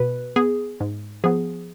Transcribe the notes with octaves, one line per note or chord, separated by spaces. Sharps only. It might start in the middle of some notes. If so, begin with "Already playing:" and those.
Already playing: B2 B4
B3 G#4
G#2
F3 B3 G#4